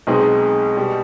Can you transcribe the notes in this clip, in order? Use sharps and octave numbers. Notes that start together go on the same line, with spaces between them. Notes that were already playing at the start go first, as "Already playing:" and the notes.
B1 B2 G#3 C4 D#4
B2 G3